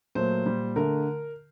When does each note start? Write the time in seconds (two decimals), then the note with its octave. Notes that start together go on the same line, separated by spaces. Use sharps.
0.15 A#2 F#3 A3 C5
0.45 A#2 G3
0.76 D3 A3 A#4